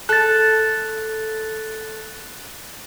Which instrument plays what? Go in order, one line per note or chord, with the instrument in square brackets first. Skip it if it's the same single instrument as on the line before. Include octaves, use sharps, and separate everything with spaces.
[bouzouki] A4 [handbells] F#6 A6